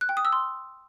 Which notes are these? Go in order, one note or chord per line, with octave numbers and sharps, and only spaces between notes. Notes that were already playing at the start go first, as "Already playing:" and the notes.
F#6
G5
D#6
E6
C6